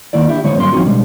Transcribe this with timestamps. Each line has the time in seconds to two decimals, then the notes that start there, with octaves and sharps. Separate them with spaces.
0.13 D#3 A#3 E4 D5
0.28 D4 E4 G4
0.44 D3 G#3 B3 C#4 C5 C#5
0.56 G2 F#3 A#3 C#4 C6
0.72 F3 C4 C#4 D#4 F#4
0.86 B2 D3 G3 G#3